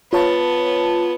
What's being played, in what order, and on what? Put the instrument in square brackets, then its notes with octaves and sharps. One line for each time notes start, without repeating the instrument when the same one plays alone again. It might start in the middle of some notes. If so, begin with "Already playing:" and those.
[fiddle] B3 [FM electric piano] F4 C#5 A5